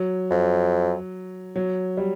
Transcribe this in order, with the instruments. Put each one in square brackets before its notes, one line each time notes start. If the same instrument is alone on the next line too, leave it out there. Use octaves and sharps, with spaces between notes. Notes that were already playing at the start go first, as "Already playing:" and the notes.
Already playing: [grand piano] F#3
[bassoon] F2
[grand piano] F#3
G3